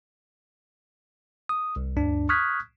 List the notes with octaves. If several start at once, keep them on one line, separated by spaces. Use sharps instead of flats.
D#6
C2
D2 G2 D4
C#6 D#6 F6 F#6 G#6 B6